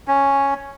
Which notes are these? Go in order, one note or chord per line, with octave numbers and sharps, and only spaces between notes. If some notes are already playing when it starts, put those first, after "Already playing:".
C#4